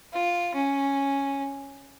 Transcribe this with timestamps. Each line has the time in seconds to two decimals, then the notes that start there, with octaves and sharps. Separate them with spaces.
0.13 F4
0.55 C#4